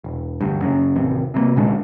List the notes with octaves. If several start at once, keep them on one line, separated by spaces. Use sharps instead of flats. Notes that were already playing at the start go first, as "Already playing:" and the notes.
E1
G1 D2 G2
F#2 C#3
A1 D#2 C3
C3 F#3 A#3
D2 A#2 G#3 D4